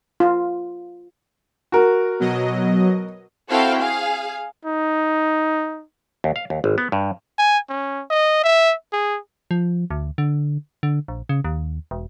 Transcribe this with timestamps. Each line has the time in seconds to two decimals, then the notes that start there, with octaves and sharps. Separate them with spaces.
0.20 F4
1.72 F#4 A#4
2.20 B2 F#3 D#5
3.49 C4 E4 F#4 A4 F5 G5
3.79 G#4 F5
4.65 D#4
6.24 D#2
6.36 F5
6.50 D#2
6.64 G#1
6.78 B3
6.92 G2
7.39 G#5
7.69 C#4
8.10 D#5
8.44 E5
8.93 G#4
9.51 F3
9.91 D2
10.18 D3
10.83 D3
11.08 A#1
11.29 C#3
11.44 D#2
11.91 E1